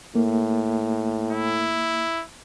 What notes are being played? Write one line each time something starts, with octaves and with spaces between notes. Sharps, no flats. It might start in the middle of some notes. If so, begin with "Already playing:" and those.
A2 A#3
E4